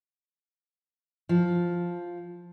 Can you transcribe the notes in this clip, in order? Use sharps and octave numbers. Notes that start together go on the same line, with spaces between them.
F3